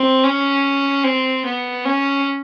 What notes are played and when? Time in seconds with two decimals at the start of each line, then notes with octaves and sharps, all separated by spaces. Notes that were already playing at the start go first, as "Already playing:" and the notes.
Already playing: C4
0.25 C#4
1.04 C4
1.45 B3
1.85 C#4